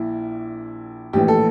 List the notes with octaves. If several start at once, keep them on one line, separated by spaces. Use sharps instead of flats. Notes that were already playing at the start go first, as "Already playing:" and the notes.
Already playing: A#1 A#2 E4
A#1 A2 E3 G4
A4